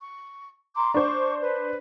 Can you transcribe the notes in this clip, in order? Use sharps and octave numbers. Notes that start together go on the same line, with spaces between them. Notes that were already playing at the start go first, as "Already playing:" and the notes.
C#6
A#5 C6 D6
D4 C5 C#6 D6
B4